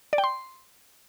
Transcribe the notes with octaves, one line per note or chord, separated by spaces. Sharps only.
D5
G5
C6